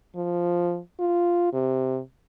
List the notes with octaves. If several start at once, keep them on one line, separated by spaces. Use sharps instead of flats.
F3
F4
C3